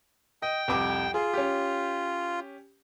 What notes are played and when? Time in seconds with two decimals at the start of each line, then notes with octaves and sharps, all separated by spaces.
0.42 D#5 G5
0.68 C2 F2 D6
1.14 F4 G#4
1.34 C#4 G4